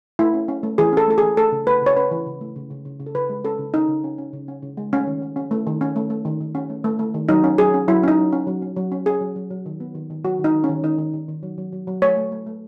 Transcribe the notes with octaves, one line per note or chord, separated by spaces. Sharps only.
A3 E4
C#4
C#4
A3
E3 G#4
C#4 A4
A3 A4
E3 G#4
A3 A4
C#3
A3 B4
C#3 C#5
C#4 B4
E3
C#3
A3
C#3
C#3
C#3
C#3
A4
C#3 B4
G#3
C#4 A4
C#3
C#4 D#4
C#3
C#4
C#4
C#3
C#4
C#3
G#3
A3 C#4
D#3
C#4
C#4
A3
D#3
C#4
A3
A3
D#3
D#3
C#4
A3
A3
A3
D#3
F#3 D#4
C#4
F#3 G#4
C#4
F#3 E4
C#4 D#4
F#3
C#4
F#3
C#4
F#3
C#4
C#4 G#4
F#3
F#3
F#3
D#3
B3
D#3
D#3
F#3 F#4
D#3
D#4
D#3
C#4
D#3
D#3 D#4
D#3
D#3
D#3
F#3
F#3
F#3
F#3
A3 C#5
A3
A3
A3